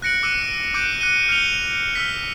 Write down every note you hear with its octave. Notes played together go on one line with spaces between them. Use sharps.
F#6 A#6 C#7 D7 F#7
D6 E6 F#6 C#7 D#7
D6 F#6 G6 D7 D#7
F#6 C#7 D#7 G7
F6 G6 C#7 D7 F7 G7
E6 F6 B6